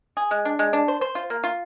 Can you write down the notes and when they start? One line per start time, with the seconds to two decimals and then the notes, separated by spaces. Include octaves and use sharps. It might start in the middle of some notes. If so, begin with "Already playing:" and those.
0.17 G#4
0.31 G#3
0.45 D4
0.59 G#3
0.73 D4
0.88 C5
1.01 C5
1.15 F4
1.30 A#3
1.44 F4